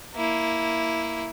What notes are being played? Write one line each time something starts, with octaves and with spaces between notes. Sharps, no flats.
A#3 E4